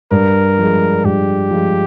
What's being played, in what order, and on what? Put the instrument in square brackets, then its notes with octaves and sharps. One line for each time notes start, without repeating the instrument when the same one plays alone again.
[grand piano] G2 [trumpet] A#4
[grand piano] F3 G#3
[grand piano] G2 [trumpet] G4
[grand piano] F3 G#3